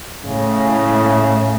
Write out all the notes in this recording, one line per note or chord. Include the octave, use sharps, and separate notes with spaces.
A2 C#3